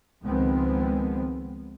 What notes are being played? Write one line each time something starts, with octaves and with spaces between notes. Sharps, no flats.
C#2 D#3 F3 G#3 B3 C4